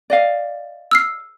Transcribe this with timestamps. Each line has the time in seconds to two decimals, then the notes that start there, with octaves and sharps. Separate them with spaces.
0.10 D5 D#5 F5
0.91 E6 F6 C7